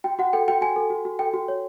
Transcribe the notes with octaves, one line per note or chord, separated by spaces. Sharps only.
F#4 G5
F#4 F#5
A4 G5
F#4 G5
F#4 G#5
A4
F#4
F#4
A4 G5
F#4
C#5